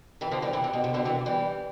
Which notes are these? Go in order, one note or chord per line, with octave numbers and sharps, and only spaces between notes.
C3 E3
D3 F3
E3 G3
C3 E3
C3
B2
C3
B2 D3
C3 E3
E3 G3